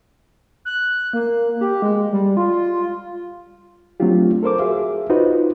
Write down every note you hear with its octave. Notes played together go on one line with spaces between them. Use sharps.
F#6
A#3
G4
G#3
G3
F4
F#3 A3 C4 D4 F4 G4
A4 A#4 C5 D6
F#4 G#4 E5 F5
D#4 F4 F#4 B4 C5 D#5